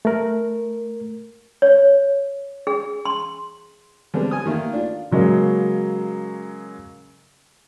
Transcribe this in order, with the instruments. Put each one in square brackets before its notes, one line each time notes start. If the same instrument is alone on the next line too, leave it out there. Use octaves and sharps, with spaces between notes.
[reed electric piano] A3 A#4
[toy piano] C#5
G#4
C6
[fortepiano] D3 G3 G#3 B3 C4
G#5 D#6
D#3 A3 A#3
D4 F4
[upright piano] C#3 F#3 G#3 A#3